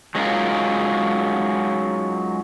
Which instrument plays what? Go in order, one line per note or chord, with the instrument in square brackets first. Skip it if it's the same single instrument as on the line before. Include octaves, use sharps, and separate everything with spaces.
[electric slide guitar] F#3 G#3 C#4 D#4 F4 A#4